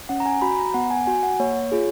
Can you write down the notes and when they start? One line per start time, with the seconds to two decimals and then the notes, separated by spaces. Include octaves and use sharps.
0.09 C#4 F#5
0.20 A#5
0.26 G#5
0.42 F#4 B5
0.52 B5
0.58 A#5
0.74 B3 F#5
0.91 G#5
1.07 F#4 G#5
1.23 F#5
1.40 A#3 C#5
1.72 F4 G#4